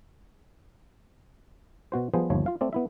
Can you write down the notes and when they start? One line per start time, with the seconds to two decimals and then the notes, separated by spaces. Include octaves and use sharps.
1.92 B2 F#4 C5
2.14 F3 G3 B3 G#4 C5
2.30 G1 D#2 F3 C#5
2.46 F4 F5
2.61 A3 C4 D5
2.73 B3 E4 E5